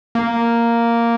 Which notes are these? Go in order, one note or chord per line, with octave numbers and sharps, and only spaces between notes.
A#3